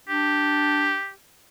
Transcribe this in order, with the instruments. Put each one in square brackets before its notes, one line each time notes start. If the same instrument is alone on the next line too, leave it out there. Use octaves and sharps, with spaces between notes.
[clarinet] D4 [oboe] G4